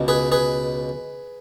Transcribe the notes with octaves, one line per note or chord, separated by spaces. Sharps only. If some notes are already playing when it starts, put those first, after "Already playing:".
Already playing: C#2 B2 G#3
G#4 B4
G#4 B4